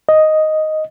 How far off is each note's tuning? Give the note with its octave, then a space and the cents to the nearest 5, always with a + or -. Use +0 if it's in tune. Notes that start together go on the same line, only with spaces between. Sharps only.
D#5 +0